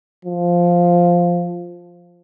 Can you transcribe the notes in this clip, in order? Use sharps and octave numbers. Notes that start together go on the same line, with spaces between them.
F3